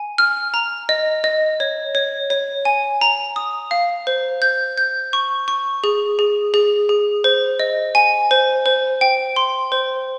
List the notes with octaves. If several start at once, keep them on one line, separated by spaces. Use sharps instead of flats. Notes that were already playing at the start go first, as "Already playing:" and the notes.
Already playing: G#5
F6
A#5
D#5
D#5
C#5
C#5
C#5
G#5
A#5
D#6
F5
C5
G6
G6
C#6
C#6
G#4
G#4
G#4
G#4
C5
D#5
G#5
C5
C5
G5
C6
C5